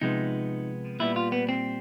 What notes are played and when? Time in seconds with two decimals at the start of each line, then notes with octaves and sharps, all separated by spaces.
0.02 C3 F3 G#3 B3 D#4
1.00 A#2 G3 B3 E4
1.16 F4
1.32 B3
1.49 C4